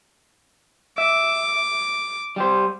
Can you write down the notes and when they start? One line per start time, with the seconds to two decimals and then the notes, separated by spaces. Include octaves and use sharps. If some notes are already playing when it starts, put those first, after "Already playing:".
0.98 E5 D6
2.36 G3 G4 C5